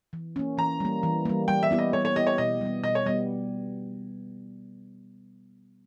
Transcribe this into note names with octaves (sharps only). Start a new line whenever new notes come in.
E3
A#3 C#4
E3 A#5
G3 A#3
E3
G3 A#3
G3 G5
E5
B3 E4 G4
D#5
G3 C#5
C#5
B3 E4 G4 D#5
C#5
B2 D#5
G3 B3
B2 D#5
C#5
G3 B3 D#5